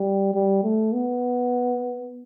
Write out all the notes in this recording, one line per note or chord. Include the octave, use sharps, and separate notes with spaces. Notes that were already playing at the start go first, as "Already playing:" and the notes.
Already playing: G3
G3
A3
B3